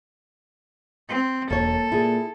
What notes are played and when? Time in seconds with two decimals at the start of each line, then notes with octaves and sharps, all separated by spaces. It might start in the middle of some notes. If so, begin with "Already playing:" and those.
1.09 C4
1.51 E1 A#3 A4 C#5
1.92 A#2 E4 G#4